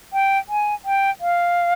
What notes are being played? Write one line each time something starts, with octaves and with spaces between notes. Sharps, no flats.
G5
G#5
G5
F5